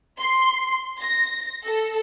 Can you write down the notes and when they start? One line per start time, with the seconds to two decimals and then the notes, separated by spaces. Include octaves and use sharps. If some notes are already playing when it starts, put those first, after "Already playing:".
0.19 C6
1.02 A#6
1.66 A4